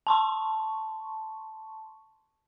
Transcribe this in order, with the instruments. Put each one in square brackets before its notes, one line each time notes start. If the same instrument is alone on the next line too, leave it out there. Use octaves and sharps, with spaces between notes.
[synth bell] A5 C6 C#6